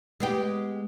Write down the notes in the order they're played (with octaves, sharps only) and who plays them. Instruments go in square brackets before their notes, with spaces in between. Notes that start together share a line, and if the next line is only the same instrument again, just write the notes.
[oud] G#3 B3 G4